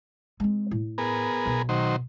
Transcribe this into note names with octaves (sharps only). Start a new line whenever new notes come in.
G#3 C4
A2
B3 G#4 A#4
B1 B2
D#3 F#3 C5